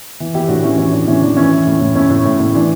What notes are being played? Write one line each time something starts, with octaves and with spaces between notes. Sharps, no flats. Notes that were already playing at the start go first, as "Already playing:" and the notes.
E3
E3 E4 G4
A2 D4 F#4
E3 C#4 E4
E3 C#4
A2 D4
E3 C#4
E3 D4
E3 C#4 E4
E3
A2
A2
A2 C#4 E4
A2
A2
A2
E3 D4